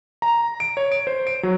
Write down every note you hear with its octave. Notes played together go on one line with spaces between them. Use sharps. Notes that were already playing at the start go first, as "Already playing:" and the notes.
A#5
D7
C#5
D7
C5
D7
F#3